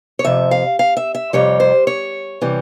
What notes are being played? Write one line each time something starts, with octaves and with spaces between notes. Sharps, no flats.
C#5
F2 C3 F3 E5
F5
F5
E5
E5
F2 C3 G3 C#5
C5
C#5
C3 E3 G3